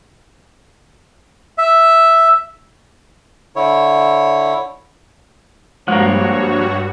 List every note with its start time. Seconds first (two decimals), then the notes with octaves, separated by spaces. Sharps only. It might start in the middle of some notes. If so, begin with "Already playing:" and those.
1.58 E5
3.56 D3 E4 C#5
5.88 G2 F3 G#3 A#3 F#4 C#5